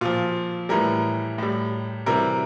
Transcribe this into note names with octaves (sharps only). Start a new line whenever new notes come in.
A#2 F3 F4
A2 E3 G3 A#4
A2 G3
C3 E3 G3 A#4